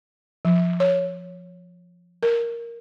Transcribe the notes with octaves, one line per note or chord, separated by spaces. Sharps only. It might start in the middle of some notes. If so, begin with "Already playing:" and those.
F3
C#5
A#4